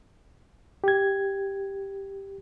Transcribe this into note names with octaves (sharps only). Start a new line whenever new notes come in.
G4 G#6